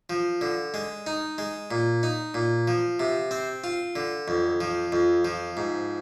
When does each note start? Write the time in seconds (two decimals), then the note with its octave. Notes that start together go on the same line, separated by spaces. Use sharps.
0.10 F3
0.41 D3
0.74 G#3
1.07 D#4
1.38 G#3
1.71 A#2
2.03 D#4
2.34 A#2
2.68 F3
3.00 C3
3.31 C4
3.64 F4
3.96 D3
4.28 F2
4.61 F3
4.92 F2
5.25 F3
5.57 G#2